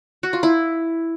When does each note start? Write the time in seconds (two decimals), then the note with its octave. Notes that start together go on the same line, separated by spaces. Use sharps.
0.23 F#4
0.33 F4
0.43 E4